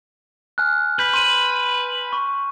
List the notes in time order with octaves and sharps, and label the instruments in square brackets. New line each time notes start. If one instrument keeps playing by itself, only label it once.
[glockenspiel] G#5 F6 F#6
[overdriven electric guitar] B4 [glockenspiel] G6 B6
[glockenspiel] C6 D#7
C#6